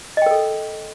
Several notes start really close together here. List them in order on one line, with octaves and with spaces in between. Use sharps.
D#5 G5 A#4 A4